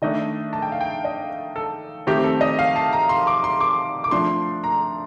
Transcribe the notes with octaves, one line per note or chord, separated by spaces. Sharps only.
D#3 A3 D4 D#5
A5
G5
F5
G5
D#5
A4
D#3 A3 C4 G4
A4
D#5
F5
A5
A#5
C6
D6
C6
D6
D6
F3 A3 D4 C6
A#5